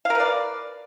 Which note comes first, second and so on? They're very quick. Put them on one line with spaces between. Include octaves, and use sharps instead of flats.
F5 A#4 B4 D5